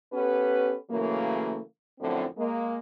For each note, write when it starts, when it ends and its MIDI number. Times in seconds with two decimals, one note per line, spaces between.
0.13 0.76 59
0.13 0.76 61
0.13 0.76 67
0.13 0.76 69
0.13 0.76 71
0.91 1.59 49
0.91 1.59 52
0.91 1.59 54
0.91 1.59 57
0.91 1.59 58
2.01 2.26 42
2.01 2.26 45
2.01 2.26 50
2.01 2.26 53
2.01 2.26 57
2.01 2.26 60
2.38 2.79 56
2.38 2.79 58